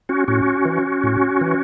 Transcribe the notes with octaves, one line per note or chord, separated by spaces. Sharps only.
C#4 F#4
A2 C#4 F#4
E3
A2
E3